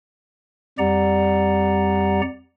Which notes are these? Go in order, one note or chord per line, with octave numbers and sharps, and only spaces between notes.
F2 G3 G4 D5 F#5 A#5